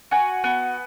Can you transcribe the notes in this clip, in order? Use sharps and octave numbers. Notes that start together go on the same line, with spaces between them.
F#4 G#5
B3